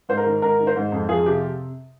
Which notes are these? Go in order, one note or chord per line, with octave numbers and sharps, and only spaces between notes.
G#2 C5
A#4
D#3
G#2 A#4
D#3
C5
G#2
F2
F3 G#4
C3 G4